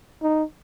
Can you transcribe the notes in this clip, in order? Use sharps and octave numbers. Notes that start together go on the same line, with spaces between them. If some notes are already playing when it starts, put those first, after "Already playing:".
D#4